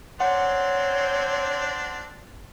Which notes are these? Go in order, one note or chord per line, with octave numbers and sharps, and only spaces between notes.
C4 D4 C#5 F#5 C6